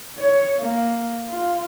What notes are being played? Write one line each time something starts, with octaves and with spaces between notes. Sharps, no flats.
C#5
A#3
F4